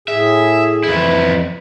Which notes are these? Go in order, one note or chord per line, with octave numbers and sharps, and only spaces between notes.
A2 G#4 E5
F2 E3 E4